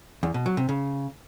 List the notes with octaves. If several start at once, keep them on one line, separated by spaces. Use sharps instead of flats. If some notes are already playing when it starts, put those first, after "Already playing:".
E2
B2
F#3
C3
C#3